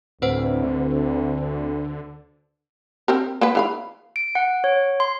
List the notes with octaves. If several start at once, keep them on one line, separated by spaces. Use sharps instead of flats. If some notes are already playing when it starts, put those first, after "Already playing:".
D2 A2 C4 B4 C5 F#5
D3
C4 G4 A#4
A#3 B3 B4
E3 F5 B5
D7
F#5
C#5
C6